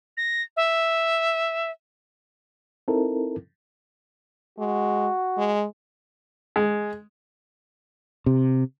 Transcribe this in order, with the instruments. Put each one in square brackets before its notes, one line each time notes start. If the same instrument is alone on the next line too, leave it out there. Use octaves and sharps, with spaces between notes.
[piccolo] A#6
E5
[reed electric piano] C4 D#4 E4 A4 A#4
[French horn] G#3 [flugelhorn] F#4
[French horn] G#3
[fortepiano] G#3
[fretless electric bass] C3